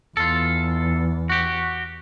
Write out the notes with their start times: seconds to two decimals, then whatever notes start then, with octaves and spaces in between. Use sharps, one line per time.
0.17 E2 F4 A4
1.29 F#4 G4